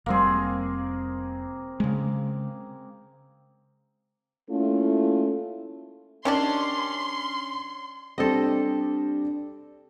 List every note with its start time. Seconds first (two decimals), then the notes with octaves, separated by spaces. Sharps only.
0.06 F1 G3 A#3 C4 G#4
1.80 C#3 G#3
4.49 A3 A#3 C#4 E4 F4 A4
6.25 D#3 G3 C#4 D4 C6
8.18 G3 C4 D4 G4 A4 D#5